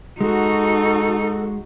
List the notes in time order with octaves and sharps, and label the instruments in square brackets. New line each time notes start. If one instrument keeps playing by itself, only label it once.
[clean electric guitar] G#3 [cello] D#4 [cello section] F#4 [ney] A4